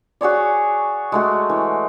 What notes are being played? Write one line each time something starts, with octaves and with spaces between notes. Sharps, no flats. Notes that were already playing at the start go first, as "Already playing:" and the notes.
F#4 G#4 C#5 D5
G#3 A3 F#4
E3